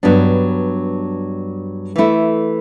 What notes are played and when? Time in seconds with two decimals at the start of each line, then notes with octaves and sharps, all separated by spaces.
0.03 G2 F#3 B3 D4
1.96 E3 A3 E4